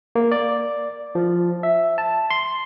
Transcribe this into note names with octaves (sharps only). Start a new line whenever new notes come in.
A#3
D5
F3
E5
A5
C6